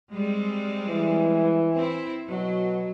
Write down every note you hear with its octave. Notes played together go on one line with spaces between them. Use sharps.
G3 G#3 C4
E3
C4 E4
B2 F#3